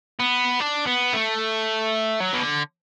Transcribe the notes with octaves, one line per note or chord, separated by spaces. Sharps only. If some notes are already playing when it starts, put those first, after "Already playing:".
B3
D4
B3
A3
F#3
B2
D3